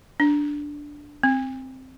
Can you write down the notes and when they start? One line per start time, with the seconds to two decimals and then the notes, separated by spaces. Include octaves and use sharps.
0.20 D4
1.23 C4